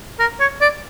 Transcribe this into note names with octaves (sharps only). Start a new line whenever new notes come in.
A#4
C#5
D5